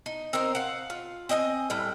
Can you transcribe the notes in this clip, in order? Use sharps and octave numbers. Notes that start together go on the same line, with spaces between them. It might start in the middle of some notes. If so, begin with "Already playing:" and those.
D#4
C4 D#4 A#4 C5
F5 F#5
F4
C4 D#5 E5 G#5
A2 G3 G5